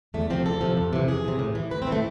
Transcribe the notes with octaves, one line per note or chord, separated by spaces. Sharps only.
E2 A3
C3 F3 C4
E2 A4
C3 F3
F2
C3 E3
F2 G#4
C3 E3
A2
E3
A2 B4
C4
E3
A3